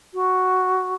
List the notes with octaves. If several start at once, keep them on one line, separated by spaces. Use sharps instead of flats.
F#4